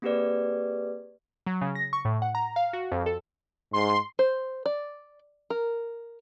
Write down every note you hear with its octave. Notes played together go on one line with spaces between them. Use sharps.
A#3 C4 G4 G#4 B4 D5
F#3
C#3
A#6
C#6
A2
F#5
A#5
F5
F#4
F2
A4
G#2 C6
C5
D5
A#4